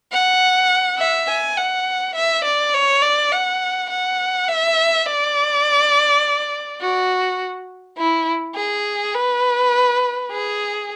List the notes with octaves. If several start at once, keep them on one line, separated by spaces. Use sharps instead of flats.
F#5
E5
G#5
F#5
E5
D5
C#5
D5
F#5
F#5
E5
D5
F#4
E4
G#4
B4
G#4